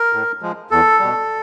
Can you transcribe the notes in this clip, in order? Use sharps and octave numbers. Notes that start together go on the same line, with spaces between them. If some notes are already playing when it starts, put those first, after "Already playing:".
Already playing: A#4
A2
F3 G#3
E2 A4
B2 G3